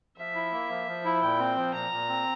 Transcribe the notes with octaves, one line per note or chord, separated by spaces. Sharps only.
F3 E5
E4
A#3
F3
F3
E4
A#2 G5
C4
F3
A#2 A#5
A#2
C4